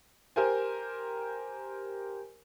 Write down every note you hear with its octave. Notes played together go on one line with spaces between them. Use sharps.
G4 A#4 C5 G#5